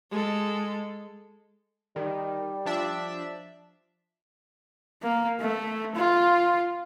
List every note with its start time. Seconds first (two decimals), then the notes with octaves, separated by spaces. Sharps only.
0.11 G#3 A4
1.96 D#3 G3
2.66 F3 D4 E5
5.03 A#3
5.40 A3
5.95 F4